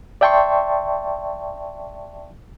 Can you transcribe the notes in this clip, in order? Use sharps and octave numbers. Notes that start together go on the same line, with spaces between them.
D5 E5 G5 A5 C6 C#6